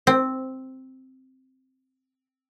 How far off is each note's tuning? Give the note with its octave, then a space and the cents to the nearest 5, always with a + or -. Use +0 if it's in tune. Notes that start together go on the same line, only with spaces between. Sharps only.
C4 +0